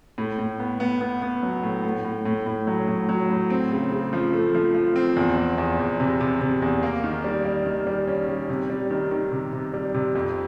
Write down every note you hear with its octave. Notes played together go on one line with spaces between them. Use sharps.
A2
A2
B3
B3
B3
B3
F#3
A2
A2
A2
A2
A2
F#3
A2
F#3
A2
C4
C#3
C#3
F3
A3
F3
F3
C4
E2
E2
E2
E2
C3
C3
C3
E2
A#3
D#3
G3
G3
D#3
G3
C#4
G3
C3
G3
D#3
D#3
C3
C3
G3
C3
F2